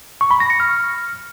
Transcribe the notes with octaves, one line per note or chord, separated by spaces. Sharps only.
C#6
B5
A#6
C#7
F6